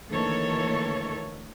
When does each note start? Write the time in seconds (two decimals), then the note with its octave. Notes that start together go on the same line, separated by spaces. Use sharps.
0.10 D2 D#3 E3 A#3 A4 C#5